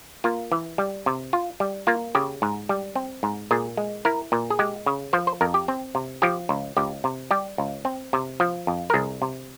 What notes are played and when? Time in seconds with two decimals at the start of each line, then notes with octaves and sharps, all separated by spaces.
0.24 A#3 F4
0.52 E3
0.78 G3
1.06 C3
1.33 F4
1.60 G3
1.87 A#3 F4
2.15 C#3 G4
2.42 G#2
2.69 G3
2.95 C4
3.23 G#2
3.51 A#2 G#4
3.77 G#3
4.05 E4 A#4
4.32 A#2
4.50 G#4
4.59 G#3 G4
4.86 C#3
5.13 F3 C5
5.27 C5
5.41 F2 A#4
5.54 G4
5.68 C4
5.95 C3
6.22 F3 G4
6.49 C#2
6.77 C#2 G4
7.04 C3
7.31 G3 G4
7.58 C#2
7.85 C4
8.13 C3
8.40 F3
8.67 F2
8.90 A#4
8.94 C2 G#4
9.22 C3